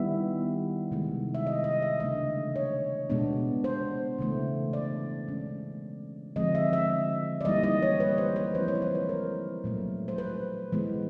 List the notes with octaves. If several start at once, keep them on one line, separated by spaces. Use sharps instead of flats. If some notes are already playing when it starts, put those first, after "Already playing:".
Already playing: D#3 G3 B3 E4 E5
C3 D#3 G#3
E5
D#5
D#5
E5
C#3 E3 A3 D4 D#5
C#5
B2 G#3 B3 D4
C5
C#3 E3 A3
D5
E3 G#3 C#4
D3 F3 G#3 C4 D#5
E5
E5
D5
E3 G3 A#3 D#4 D#5
D#5
C#5
B4
C5
B4
F3 G#3 C4 E4 C5
C#5
B4
C5
B4
A#4
A#2 F#3 A3
C5
B4
E3 G#3 B3